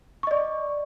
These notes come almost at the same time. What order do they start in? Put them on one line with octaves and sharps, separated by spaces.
C#6 D#5 D5